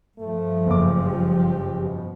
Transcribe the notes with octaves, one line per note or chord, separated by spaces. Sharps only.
G2 F3 A3
F#1 D6
G4
B2